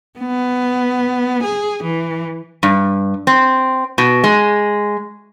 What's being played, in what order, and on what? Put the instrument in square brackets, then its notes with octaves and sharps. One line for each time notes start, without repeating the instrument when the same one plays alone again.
[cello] B3
G#4
E3
[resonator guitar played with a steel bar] G2
C4
B2
G#3